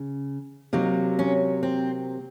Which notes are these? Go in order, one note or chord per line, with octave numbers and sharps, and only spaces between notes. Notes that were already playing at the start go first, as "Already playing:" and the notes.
Already playing: C#3
C3 F#3 A#3 D#4
C#4
C4